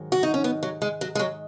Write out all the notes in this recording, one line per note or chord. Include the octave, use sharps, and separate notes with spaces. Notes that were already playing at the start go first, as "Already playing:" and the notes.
Already playing: G#2 D#3 F#3
F#4
D#4
C#4
B3
F#3
G#3
F#3
G#3
F#3